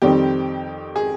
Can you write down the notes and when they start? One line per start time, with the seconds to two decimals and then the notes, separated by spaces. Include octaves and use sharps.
0.02 F2 D#3 G3 C4 G4
0.96 G#4